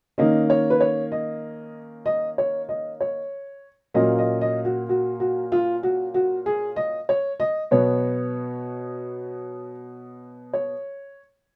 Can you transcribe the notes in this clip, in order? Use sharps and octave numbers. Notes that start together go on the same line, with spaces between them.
D#3 A#3 C#4 D#5
C#5
B4
C#5
D#5
D#5
C#5
D#5
C#5
A#2 F#3 A#3 C#4 D#5
D#5
D#5
F#4
F#4
F#4
F4
F#4
F#4
G#4
D#5
C#5
D#5
B2 F#3 B3 C#5
C#5